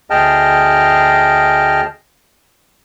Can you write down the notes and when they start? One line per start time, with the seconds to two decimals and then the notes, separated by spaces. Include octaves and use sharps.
0.10 D2 G#4 D#5 G5 A5 F6